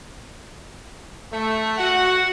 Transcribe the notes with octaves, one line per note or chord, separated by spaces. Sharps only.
A3
F#4 F#5